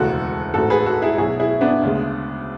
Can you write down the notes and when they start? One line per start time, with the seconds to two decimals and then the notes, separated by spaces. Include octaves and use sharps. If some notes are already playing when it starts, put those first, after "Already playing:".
Already playing: E1 D2 C#3 E3 G#3 F#4 A4
0.54 A1 G#2 G#3 F#4 A4
0.70 G#4 B4
0.86 F#4 A4
1.02 E4 G#4
1.18 B1 B2 F#3 E4 G#4
1.40 E4 G#4
1.61 B3 D4
1.82 D2 C#3 G#3